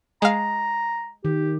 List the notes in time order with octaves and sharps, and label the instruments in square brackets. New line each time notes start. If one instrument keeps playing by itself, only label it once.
[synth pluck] G#3 F5 [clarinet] A#5
[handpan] D#3 [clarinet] G4